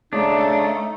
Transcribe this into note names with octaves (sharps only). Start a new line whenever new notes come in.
C#3 A3 D4 D#4